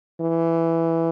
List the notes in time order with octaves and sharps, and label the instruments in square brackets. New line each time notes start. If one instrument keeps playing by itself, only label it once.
[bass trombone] E3